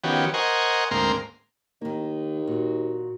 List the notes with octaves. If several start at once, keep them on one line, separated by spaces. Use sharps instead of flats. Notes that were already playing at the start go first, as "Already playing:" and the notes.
D#3 F3 B3 C#4 F#4 G4
A#4 C5 D#5 F#5 G#5 C#6
D2 G#2 A#3 C4 A#4 C6
D#2 D#3 A#3
A#2 F#4